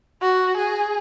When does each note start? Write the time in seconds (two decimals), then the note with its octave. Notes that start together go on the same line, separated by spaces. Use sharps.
0.22 F#4
0.57 G#4